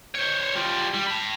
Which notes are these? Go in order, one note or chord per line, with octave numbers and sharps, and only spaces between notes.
C5 C#5
G3 F4
G3
A5 B5